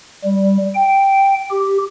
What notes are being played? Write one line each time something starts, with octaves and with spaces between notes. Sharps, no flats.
G3
G5
G4